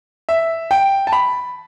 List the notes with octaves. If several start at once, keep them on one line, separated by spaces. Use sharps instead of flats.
E5
G5
A5
B5